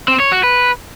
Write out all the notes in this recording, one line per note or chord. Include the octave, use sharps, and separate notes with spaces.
C4
C#5
F#4
B4